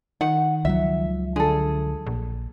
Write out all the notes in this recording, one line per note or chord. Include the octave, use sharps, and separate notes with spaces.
D#3 F#5
C#2 F3 F#3 E5
D3 G#4 A4
A#1